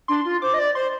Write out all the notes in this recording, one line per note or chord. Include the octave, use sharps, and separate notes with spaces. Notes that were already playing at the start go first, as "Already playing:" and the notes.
D4 C6
F4
C5 D6
D#5
D5
C5 C6